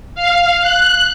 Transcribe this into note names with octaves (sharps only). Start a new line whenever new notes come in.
F5
F#6